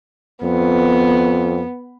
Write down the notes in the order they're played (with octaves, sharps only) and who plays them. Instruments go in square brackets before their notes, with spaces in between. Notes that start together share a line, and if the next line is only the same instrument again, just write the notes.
[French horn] F2 [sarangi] B3